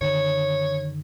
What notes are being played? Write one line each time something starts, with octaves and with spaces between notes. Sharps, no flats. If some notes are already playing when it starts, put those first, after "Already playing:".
F#2 D3 D#3 C#5